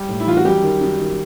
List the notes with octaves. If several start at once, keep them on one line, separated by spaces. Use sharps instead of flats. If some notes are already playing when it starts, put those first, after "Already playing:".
Already playing: G3 G4
A2
E4
E3 F4
F#4
F#2 G3 G4
D#3
F#2
D#3